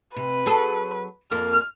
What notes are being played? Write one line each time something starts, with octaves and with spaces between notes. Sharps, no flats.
C3 B4
F#3 G#4 A4
F2 A#3 F6